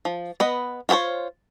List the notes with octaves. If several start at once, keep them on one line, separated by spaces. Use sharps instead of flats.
F3
B3 B4 D#5
F4 F#4 G#4 C5 C#5